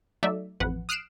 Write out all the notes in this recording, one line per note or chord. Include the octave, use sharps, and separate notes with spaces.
F#3 A3 D#4 D5 E5
A1 F2 B4 F#5
D#6 F6 F#6 C7 D7 E7